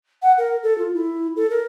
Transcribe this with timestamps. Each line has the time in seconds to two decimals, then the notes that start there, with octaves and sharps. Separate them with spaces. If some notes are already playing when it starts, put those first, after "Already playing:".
0.22 F#5
0.38 A#4
0.63 A4
0.78 F4
0.94 E4
1.36 A4
1.50 A#4